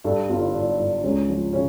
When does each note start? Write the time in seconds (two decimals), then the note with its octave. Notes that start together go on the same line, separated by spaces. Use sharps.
0.04 G2 A4
0.29 G1 F4
0.42 E4
0.54 G2 D4
0.79 G2
1.03 C#2 C#4
1.29 F3
1.53 C#3 C#4